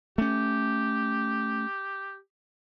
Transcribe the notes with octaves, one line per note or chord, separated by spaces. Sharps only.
A3 C#4 G4